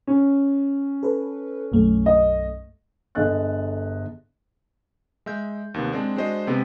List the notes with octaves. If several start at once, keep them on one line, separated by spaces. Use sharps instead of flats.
C#4
A4 B4
B1 F#2 A3
D#5
G1 D3 G#4 D#5 F#6 A6
G#3 E5 G6
D#2 C3 B3
G#3 C4 D4
G#3 D4 F#4 C5 D#5
C3 G#3 B3 C4